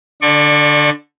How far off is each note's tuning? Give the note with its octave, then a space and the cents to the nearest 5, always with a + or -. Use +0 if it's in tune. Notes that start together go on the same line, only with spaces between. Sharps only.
D3 +0 D5 +25 C#6 -20